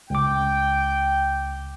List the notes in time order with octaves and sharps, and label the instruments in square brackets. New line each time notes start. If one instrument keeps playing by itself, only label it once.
[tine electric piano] C#2 D6 [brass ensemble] G5